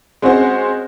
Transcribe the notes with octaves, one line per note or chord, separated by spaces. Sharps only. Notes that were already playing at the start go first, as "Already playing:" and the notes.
G#3 C4 C#4 F#4 C5